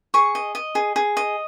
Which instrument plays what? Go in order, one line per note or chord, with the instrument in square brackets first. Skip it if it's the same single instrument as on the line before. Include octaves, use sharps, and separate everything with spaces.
[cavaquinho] G#4 C#6
D#5
D#5
G#4
G#4
D#5